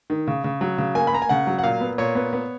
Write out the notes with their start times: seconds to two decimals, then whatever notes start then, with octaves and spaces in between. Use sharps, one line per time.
0.10 D#3
0.28 C#3
0.44 C#3
0.61 F#3
0.78 C#3
0.95 A#3 G#5
1.07 B5
1.12 A#3 A#5
1.22 G#5
1.29 C#3 F#5
1.47 F#3
1.58 F#5
1.64 A#2 F5
1.81 B3
1.98 A#2 C#5
2.15 B3
2.33 B3